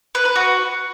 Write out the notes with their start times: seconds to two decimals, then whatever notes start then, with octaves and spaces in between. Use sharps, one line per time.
0.15 B4
0.25 B4
0.36 F#4